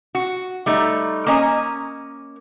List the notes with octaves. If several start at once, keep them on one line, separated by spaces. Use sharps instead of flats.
F#4
G3 A3 D#4
A#3 C#4 D#5 G#5 A#5